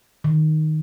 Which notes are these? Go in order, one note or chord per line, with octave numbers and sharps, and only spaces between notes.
D#3